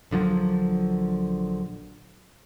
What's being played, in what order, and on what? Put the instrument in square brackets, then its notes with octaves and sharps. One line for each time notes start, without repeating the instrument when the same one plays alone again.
[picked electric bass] A#1 D3 F3 F#3